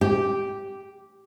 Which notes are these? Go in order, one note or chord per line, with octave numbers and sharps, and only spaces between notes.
G4